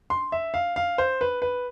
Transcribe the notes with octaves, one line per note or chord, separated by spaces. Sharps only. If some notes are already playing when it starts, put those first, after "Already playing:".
C6
E5
F5
F5
C5
B4
B4